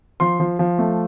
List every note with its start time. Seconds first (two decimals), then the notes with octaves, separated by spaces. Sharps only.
0.20 F3 C6
0.40 F3
0.59 F3
0.78 A3